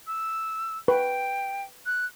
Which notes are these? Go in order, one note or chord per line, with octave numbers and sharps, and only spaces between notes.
E6
B4 G5
F#6